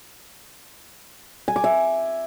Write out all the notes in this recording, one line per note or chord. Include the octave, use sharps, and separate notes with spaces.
G#5
D6
E5